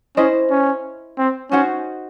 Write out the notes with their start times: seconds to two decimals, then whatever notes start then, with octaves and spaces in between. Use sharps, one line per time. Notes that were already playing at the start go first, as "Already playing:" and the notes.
0.17 C#4 E4 C5 D#5
0.51 C#4
1.18 C4
1.51 C#4 D#4 F#4 C5 F#5